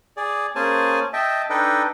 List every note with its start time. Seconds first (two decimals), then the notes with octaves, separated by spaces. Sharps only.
0.17 G#4 D5
0.56 A#3 C#4 G#4 C5 G#5 A5
1.13 D#5 E5 G5 A5
1.50 D4 D#4 A4 B4 D#5 G5